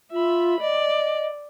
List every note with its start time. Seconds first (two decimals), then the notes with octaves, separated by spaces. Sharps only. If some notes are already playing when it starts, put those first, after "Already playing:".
0.12 F4 E5 B5
0.60 D5 D#5